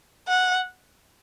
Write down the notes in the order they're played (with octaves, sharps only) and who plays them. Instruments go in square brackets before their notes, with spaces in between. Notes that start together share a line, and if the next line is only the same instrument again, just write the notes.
[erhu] F#5